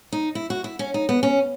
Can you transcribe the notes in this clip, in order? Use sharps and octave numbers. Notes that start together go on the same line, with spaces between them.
D#4
E4
F#4
E4
C#4
D#4
B3
C#4